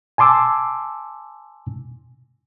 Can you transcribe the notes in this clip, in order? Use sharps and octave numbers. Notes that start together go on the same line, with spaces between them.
G#5 A5 C6 D6 E6